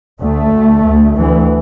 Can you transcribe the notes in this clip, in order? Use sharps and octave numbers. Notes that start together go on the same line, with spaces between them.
D2 A3
D2
D2
D2 E3